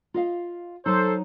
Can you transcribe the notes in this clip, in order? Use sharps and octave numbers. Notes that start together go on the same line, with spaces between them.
F4 D#5 F5
F#3 D#4 A4 C5